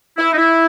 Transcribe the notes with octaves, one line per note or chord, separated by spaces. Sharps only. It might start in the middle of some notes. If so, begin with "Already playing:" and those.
E4
D#4
E4